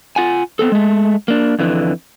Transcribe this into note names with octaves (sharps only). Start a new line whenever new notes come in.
F4 F#5 G#5
B3 C4 A4
G#3 A3
A#3 D4
F2 D3 E3